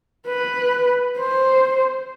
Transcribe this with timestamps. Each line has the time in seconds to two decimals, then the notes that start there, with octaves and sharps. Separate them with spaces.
0.27 B4
1.18 C5